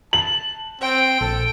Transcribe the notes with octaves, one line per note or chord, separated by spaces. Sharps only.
A5 F#7
C4 G5
A#1 A4